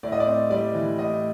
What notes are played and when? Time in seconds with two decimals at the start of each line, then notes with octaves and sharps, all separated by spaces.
0.03 A2 D5
0.12 D#5
0.20 D5
0.27 C4
0.50 G3 D5
0.74 E3
0.99 A2 D#5